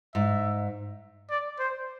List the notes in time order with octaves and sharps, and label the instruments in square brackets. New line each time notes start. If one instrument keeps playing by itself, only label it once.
[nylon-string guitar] G#2 [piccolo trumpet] E5
[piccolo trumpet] D5
C5